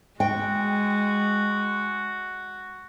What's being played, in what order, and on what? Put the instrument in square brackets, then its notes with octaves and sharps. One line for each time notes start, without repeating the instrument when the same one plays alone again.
[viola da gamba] G#3 [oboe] F#4 [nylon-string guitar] G5